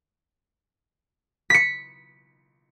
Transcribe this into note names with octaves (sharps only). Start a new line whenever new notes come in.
B6 C#7